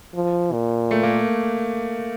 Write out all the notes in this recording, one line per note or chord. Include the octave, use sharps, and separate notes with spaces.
F3
A#2
A3
A#3